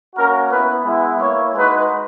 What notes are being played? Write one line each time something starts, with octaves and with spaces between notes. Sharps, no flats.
A#3 C#4 F#4 A#4
B3 E4 B4
G#3 B3 E4
A#3 E4 C#5
G#3 D#4 F#4 B4